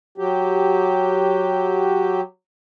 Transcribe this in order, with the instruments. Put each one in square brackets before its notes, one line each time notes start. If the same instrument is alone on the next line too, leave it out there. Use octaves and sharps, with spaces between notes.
[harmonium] F#3 G4